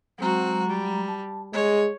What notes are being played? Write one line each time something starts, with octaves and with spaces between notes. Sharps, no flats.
F#3 G#3 C4 F#4 A#5
G3
A5
G#3 G#4 C#5